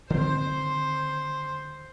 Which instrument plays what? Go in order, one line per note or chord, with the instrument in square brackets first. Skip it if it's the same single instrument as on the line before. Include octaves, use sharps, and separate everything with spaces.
[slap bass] D3 D#3 C4 [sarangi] C5